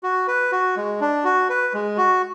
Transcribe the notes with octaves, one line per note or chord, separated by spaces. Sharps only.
F#4
B4
F#4
G#3
D4
F#4
B4
G#3
F#4